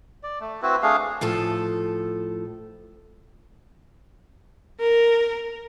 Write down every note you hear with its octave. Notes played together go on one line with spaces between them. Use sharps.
D5
A3
C4 E4 F#4 B4
A3 D4 G#4 F5
A2 F3 A4
A#4